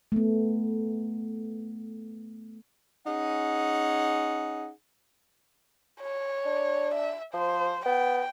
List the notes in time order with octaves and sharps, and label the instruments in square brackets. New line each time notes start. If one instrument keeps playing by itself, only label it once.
[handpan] A3 B3
[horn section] C#4 D#4 G#4 F#5
[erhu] C#5
[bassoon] D4
[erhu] E5
[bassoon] F3 [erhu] C5
[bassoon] B3 [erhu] G5